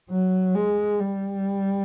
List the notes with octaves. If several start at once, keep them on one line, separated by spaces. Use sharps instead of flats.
F#3
G#3
G3